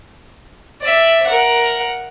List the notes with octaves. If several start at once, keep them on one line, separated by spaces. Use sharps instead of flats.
D5 E5
A#4 F#5